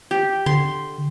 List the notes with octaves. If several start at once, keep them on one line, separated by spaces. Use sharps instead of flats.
G4
D3 C6